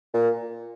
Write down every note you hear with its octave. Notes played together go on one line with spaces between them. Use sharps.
A#2